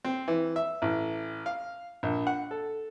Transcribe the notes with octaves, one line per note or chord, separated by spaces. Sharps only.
C4
E3
E5
A1
F5
A#1
F#5
A4